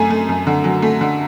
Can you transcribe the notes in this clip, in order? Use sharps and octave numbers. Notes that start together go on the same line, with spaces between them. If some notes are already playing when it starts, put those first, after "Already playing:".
Already playing: F#2 A3 G#5
A3
F#2
D3
F#3
A3
D3